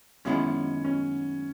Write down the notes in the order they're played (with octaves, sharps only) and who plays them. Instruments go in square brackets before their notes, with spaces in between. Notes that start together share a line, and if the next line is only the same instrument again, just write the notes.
[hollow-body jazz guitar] F#2 D#3 G#3 B3 E4 [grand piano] C#4
[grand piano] C#4